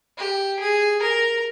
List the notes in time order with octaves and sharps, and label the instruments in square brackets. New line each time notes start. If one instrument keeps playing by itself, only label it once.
[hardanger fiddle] G4
G#4
A#4